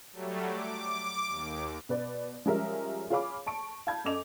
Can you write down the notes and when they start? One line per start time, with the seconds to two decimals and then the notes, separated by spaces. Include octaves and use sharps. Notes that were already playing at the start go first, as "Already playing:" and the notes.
0.13 F#3 G3 A3
0.47 D6
1.26 D#2
1.89 B2 B4 D5
2.46 F3 G3 G#3 C#4 A#4 E5
3.10 F4 G#4 C#5 F5 B5 D6
3.47 A5 C#6 D7
3.87 F5 A5 B5 G6 G#6
4.04 F#2 A4 D#5 D6 F7